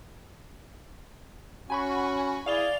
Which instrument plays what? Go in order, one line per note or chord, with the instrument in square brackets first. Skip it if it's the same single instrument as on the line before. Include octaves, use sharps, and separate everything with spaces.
[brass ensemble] C#4 F#4 [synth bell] G#5 B5 C#6
[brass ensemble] E4 G#4 [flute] D5 [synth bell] F5 F7 G7